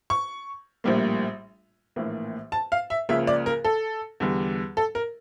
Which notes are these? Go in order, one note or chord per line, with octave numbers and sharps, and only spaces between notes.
C#6
A#1 A2 G3 A#3
A#1 A2 E3 A#3
A5
F5
E5
C#2 C#3 F3 A#3 E5
D5
A#4
A4
E2 D3 G3
A4
A#4